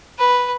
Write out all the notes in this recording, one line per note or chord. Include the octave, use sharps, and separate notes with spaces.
B4